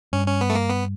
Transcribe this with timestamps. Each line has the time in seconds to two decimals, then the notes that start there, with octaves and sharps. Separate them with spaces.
0.13 G2 C#4
0.27 C#4
0.41 B3
0.50 A3
0.55 A#3
0.69 B3